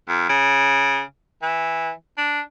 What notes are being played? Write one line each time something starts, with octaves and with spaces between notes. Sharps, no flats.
F2
C#3
E3
D4